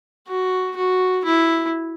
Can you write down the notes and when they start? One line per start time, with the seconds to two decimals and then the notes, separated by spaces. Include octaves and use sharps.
0.28 F#4
0.76 F#4
1.24 E4